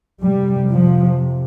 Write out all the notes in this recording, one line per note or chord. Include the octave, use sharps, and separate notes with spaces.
F2 C3 G3
F3